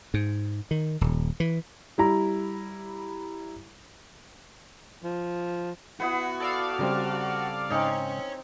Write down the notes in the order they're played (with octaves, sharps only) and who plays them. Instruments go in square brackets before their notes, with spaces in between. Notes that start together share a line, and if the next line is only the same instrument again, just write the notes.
[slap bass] G#2
D#3
D#1
E3
[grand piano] G3 E4 A#5
[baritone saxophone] F3
[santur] B3 E4 B4 [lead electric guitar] F#4
[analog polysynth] A4 D5 F5
[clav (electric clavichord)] C#3 G3 C4 [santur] A#4
[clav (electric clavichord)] G#2 C#3 [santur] C4 D#4 [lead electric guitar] C#5 G#5